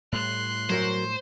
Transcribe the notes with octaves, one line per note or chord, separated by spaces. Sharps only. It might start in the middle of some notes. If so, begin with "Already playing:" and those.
A2 G3 C6 F#6
F#3 A#4 C5 C#5